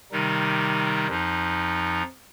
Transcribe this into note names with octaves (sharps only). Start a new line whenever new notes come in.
C3 D#3 G3 D#4
F2 F3 D#4